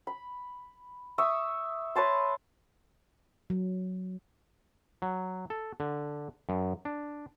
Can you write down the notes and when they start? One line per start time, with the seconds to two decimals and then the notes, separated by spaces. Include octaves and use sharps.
0.07 B5
1.18 E5 C#6 D#6
1.95 B4 C#5 A5 C6
3.50 F#3
5.02 F#3
5.50 A4
5.80 D3
6.49 F#2
6.85 D4